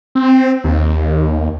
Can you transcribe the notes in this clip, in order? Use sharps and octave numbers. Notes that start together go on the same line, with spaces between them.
C4
D#2